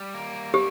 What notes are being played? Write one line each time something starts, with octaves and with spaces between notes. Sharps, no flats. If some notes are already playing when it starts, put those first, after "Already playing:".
Already playing: G3
A#3
D3 G4